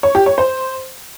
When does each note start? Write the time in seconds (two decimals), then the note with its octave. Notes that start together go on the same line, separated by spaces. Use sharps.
0.03 C#5
0.15 G4
0.26 C#5
0.38 C5